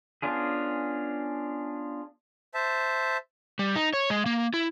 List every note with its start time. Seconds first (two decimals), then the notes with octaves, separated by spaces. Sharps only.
0.22 B3 C#4 D4 F4 G#4
2.54 C5 E5 A5
3.59 G3
3.76 D#4
3.93 C#5
4.10 G#3
4.26 A#3
4.54 E4